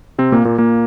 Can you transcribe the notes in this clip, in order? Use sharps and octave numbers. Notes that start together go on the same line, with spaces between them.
C3 C4
A#2 A#3
A#2 A#3
A#2 A#3